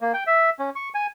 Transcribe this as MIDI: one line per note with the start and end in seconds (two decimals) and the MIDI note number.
0.01 0.12 58
0.14 0.24 79
0.27 0.50 76
0.59 0.70 61
0.75 0.89 85
0.94 1.07 80